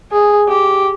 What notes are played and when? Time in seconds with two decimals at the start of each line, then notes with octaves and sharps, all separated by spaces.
0.12 G#4
0.49 G4